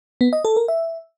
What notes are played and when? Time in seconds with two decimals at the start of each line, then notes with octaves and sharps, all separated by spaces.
0.21 B3
0.33 D#5
0.45 A4
0.56 A#4
0.68 E5